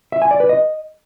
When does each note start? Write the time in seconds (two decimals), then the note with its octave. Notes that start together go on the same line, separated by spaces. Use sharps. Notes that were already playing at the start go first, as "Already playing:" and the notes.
0.12 E5
0.22 G#5
0.31 D5
0.40 B4
0.49 D#5